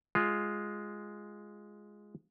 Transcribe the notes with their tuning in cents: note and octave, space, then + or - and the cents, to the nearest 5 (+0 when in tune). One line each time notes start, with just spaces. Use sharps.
G#3 +0 F4 +0